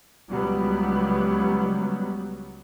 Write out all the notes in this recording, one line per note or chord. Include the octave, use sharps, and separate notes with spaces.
C#2 F#3 G3 B3